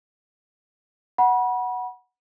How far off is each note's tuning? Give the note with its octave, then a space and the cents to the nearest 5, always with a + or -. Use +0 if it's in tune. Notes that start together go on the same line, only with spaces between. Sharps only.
F#5 +0 B5 -35